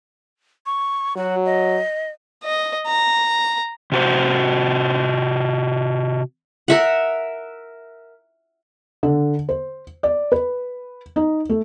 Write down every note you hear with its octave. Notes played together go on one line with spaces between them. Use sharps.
C#6
F#3 F#4
D#5
D#5
A#5
C3 F#4 C5
A#4 E5 F#5
D3
C5
D5
B4
D#4
A3